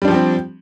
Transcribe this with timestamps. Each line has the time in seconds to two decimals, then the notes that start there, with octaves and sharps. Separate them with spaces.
0.02 G3
0.05 D4
0.08 F3
0.11 G4
0.14 C4